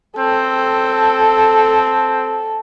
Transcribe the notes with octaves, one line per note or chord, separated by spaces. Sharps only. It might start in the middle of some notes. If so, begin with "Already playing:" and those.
C4 A4